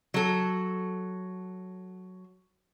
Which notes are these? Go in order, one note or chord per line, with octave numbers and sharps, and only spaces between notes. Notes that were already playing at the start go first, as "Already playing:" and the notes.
F#3 A4